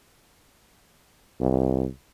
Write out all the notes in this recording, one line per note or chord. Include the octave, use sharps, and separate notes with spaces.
C2